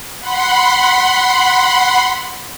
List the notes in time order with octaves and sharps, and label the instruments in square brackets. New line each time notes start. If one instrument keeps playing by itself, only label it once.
[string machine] F#5 B5 C6